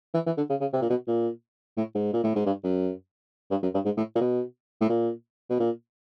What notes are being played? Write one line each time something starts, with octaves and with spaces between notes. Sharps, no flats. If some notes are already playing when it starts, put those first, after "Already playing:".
E3
E3
D3
C#3
C#3
C3
A#2
B2
A#2
A2
G#2
A#2
A2
G#2
G2
F#2
G2
F#2
G2
G#2
A2
A#2
B2
A2
A#2
B2
A#2